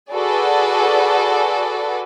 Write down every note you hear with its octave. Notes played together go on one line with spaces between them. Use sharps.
F#4 G#4 A4 B4 D5